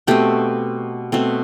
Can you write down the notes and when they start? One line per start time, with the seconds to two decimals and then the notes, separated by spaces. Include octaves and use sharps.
0.07 B2 A3 C4 G4
1.12 B2 A3 C4